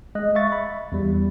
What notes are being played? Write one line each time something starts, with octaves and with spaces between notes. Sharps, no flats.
G#3 D#5 F#6
E5 F5 C#6 A6
B5
E2 G3